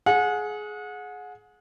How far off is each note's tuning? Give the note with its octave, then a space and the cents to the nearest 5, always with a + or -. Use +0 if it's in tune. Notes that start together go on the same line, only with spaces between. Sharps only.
G#4 +20 F#5 -30